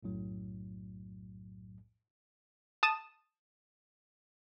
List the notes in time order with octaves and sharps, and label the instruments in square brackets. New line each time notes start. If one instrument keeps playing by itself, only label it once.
[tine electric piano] B1 F#2 A2 F#3
[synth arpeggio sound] A5 D#6 E7